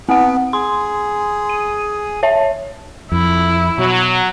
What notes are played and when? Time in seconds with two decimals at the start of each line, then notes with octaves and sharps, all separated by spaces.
0.09 B3 C4 F#5
0.53 G#4 C6
1.49 D#7
2.23 C#5 E5 A5
3.12 F2 E4
3.78 B2 F#3